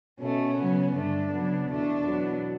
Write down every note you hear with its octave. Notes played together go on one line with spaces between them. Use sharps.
B2 A3 C#4
C#3 F#3 B3
G2 D3 A3 D4
C#3 F#3 B3
E2 B2 A3 D4
E2 B2 F#3 B3